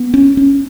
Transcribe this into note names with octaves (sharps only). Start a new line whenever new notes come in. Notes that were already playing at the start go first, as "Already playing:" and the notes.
Already playing: B3
C#4
C#4